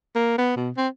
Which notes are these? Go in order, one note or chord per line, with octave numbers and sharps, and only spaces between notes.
A#3
B3
B2
C4